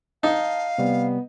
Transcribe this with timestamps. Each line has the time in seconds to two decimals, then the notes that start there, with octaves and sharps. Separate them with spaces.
0.23 D#4 F5 A5
0.78 C3 G3 B3